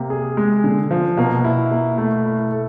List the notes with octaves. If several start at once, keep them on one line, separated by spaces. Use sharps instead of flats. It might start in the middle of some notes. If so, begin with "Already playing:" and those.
Already playing: C3 A#3
G#4
G#3
D3
F3
B2 A#3
E4
A#3
A3
E4
A4